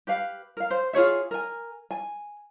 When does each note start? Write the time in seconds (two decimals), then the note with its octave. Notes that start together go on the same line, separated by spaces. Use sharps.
0.07 G4 B4 F5
0.57 A#4 F5
0.71 C5
0.93 F4 G#4 C#5 E5
1.31 A#4 G#5
1.91 G#5